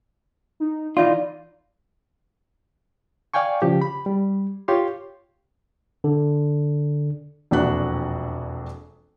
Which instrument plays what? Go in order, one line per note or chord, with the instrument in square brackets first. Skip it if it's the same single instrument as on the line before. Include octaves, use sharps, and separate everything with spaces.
[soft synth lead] D#4
[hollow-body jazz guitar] E3 D#4 F4 [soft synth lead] D5
[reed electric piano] D5 F5 G5 G#5 C#6
C#3 F3 G4
B5
G3
F4 G4 C#5 F5 C6
[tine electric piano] D3
[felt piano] E1 A#1 F2 D4 F#4 F#6